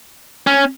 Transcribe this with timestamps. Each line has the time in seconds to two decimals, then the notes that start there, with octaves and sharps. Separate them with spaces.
0.47 C#4